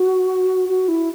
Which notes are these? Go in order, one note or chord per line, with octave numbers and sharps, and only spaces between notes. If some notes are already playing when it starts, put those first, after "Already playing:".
Already playing: F#4
F#4
E4